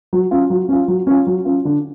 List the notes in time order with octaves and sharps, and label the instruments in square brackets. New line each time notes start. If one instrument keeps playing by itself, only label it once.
[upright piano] F#3
C#4 F4
F#3
C#4 F4
F#3
C#4 F4
F#3
C#4 F4
D3